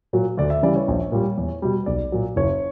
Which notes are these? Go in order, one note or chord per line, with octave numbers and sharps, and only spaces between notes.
A#2 F#3
D2 D5
E5
C#3 E3 G3 D5
C#5
A#1
A#2 G3
E2
B2 G3
B1 D5
A#2 F#3
F#1 C#5